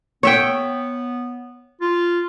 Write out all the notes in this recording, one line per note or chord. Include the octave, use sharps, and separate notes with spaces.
B3 C#5 E5 G5
F4